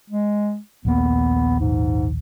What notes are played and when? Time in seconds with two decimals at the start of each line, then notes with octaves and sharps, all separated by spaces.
0.10 G#3
0.85 A#1 D#2 A#3 B3
1.59 G#2